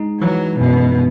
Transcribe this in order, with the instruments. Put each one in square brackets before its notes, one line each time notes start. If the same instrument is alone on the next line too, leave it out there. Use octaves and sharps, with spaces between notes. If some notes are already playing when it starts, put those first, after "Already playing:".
Already playing: [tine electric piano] G#3 D#4
[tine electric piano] E3 [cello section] F#3
[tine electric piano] F#2 [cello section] B2